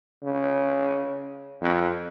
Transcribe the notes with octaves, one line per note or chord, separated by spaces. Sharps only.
C#3
F2